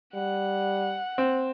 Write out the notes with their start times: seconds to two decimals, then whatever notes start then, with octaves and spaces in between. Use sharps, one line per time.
0.14 G3 F#5
1.18 C4